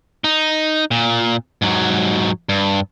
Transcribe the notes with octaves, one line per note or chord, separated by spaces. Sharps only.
D#4
A#2
G#2 F#3
G2